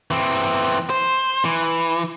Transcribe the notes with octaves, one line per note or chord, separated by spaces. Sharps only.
E3 C4
C5
E3